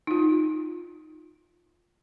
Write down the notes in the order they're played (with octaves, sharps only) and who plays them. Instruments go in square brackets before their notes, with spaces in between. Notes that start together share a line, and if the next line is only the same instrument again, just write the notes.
[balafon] D#4 F4